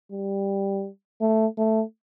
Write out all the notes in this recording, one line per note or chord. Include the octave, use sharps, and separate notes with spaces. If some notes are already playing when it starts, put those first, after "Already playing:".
G3
A3
A3